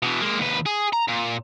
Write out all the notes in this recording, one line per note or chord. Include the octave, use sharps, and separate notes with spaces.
B2 E3
G#3 A#3
D#2 B4
G#4
A#5
A#2